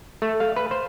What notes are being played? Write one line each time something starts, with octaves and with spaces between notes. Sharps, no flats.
A3
F5
B4
C5